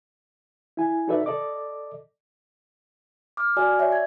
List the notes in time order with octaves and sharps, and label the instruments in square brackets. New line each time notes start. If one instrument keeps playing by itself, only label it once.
[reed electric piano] E4 G#5
D#4 F#4 A4 B4 D5 E5
A4 D5 D#5 D6
[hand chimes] D6 F6
F#4 D5 G#5
C#5 D5 E5
G#6